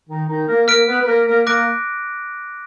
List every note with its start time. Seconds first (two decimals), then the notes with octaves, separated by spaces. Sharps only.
0.09 D#3 D#4
0.29 D#3 D#4
0.48 A#3 A#4
0.67 A#3 A#4 F6 B6 D7
0.87 B3 B4
1.00 B4
1.07 A#3 A#4
1.27 A#3 A#4
1.46 A#3 A#4 D6 F#6 A#6 D7